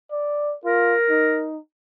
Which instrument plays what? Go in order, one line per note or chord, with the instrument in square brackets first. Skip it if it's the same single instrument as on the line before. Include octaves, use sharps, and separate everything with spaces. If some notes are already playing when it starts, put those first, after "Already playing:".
[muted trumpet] D5
[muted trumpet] F4 [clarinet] A#4
[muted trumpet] D#4